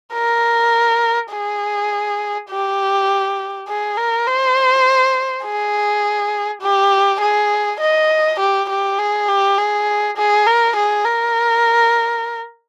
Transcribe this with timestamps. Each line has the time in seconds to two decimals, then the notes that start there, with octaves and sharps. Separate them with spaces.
0.13 A#4
1.31 G#4
2.50 G4
3.68 G#4
3.97 A#4
4.26 C5
5.45 G#4
6.62 G4
7.21 G#4
7.81 D#5
8.39 G4
8.69 G4
8.98 G#4
9.28 G4
9.58 G#4
10.17 G#4
10.47 A#4
10.76 G#4
11.04 A#4